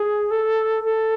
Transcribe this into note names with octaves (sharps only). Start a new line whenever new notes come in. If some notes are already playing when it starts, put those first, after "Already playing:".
Already playing: G#4
A4
A4